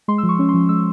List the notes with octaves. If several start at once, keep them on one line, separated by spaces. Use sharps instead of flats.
G#3 C6
E6
F3
C#6
C#4
C6
F3
G#3 E6